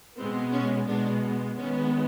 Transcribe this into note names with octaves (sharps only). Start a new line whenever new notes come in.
B2 G#3 B3 C4
C#4
B2 G#3 B3 D4
D#3 G#3 B3 C#4